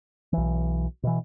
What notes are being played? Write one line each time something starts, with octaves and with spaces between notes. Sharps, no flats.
B1 E3
B2 E3